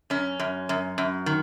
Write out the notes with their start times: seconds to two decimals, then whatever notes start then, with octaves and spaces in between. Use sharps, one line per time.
0.10 F#2 C#4
0.39 F#2
0.69 F#2
0.98 F#2
1.26 D#3